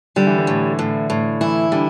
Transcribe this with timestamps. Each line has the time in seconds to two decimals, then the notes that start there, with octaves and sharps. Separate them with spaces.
0.16 D3 G3
0.27 E3
0.38 D3
0.47 A2
0.79 A2
1.10 A2
1.41 E3 E4
1.72 D3 G3